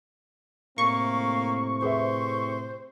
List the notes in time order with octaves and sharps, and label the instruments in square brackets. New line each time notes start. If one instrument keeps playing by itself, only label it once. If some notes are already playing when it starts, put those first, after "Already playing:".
[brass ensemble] A2 C3 C4 [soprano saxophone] A#3 [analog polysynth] C#6
[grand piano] G#4 B4 E5 [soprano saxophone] C5